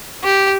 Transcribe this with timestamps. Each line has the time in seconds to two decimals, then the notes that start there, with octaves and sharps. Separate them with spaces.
0.24 G4